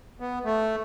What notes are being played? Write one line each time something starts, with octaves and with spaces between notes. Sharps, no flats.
B3
A3